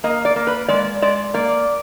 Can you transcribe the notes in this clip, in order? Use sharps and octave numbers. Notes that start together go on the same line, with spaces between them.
A#3 D#5
D5
A#3
B4
G#3 D5
G#3 D5
A#3 D5